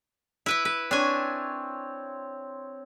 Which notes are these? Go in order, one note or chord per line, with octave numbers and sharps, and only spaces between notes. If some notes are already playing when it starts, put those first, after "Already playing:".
E4 B4 E5
B4
C4 D4 C#5 G#5